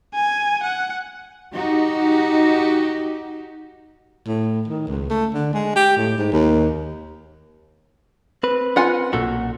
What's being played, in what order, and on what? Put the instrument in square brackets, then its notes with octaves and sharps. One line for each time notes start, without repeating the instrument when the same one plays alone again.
[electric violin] G#5
F#5
[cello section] D#4 F#4 G4
[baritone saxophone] A2
D#3
C#2
A3
D3
G#3
G4
A2
G#2
D#2
[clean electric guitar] C4 B4
[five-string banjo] F4 F#5 G#5
[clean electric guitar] B1 A#2 F#4 [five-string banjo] A4